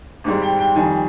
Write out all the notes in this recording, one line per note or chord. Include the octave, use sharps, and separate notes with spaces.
G#1 G#2 G3
G5
G5
F2 D#3 G3 G#5